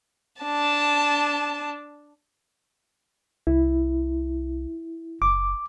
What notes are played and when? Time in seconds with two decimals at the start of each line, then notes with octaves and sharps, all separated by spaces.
0.42 D4 A5
3.47 C2 E4
5.22 F#1 D6